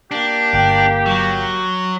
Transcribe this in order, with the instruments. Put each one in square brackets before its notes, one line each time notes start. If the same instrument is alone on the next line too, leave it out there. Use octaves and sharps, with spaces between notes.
[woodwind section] A#3 G4 [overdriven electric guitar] D4
[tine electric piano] G1 G5
[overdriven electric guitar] F#3